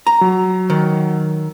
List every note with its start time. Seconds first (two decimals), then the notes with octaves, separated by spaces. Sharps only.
0.07 A#5
0.21 F#3
0.70 D#3